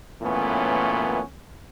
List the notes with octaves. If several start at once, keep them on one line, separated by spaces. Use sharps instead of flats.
F#2 A#2 E3 A3 B3 C#4